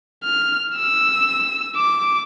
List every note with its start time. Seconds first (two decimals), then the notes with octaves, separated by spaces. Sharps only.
0.24 F6
0.76 E6
1.76 D6